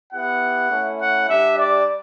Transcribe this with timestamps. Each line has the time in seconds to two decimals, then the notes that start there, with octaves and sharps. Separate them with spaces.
0.13 B3 E4 G4 F#5
0.71 A3 C#4 E4
1.00 F#5
1.29 G3 D4 G4 E5
1.58 D5